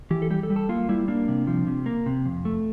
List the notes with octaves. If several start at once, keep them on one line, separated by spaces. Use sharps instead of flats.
E3 G4
A4
G3 G4
A4
G3
A4
A#3 F4
G3 E4
A#3 D4
C3
F3
C3
A#3
C3
F2
A3